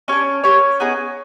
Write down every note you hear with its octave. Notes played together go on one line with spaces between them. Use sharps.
C#4 D4 G4 C#5
A#3 C#4 G4 C#5
B3 D#4 G#4